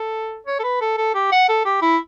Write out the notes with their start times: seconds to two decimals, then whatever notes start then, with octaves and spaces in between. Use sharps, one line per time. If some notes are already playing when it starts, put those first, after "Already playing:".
Already playing: A4
0.47 C#5
0.59 A4
0.63 B4
0.81 A4
0.97 A4
1.14 G4
1.32 F#5
1.49 A4
1.65 G4
1.82 E4